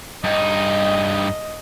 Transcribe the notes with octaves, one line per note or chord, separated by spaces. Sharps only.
G2 D#4 D#5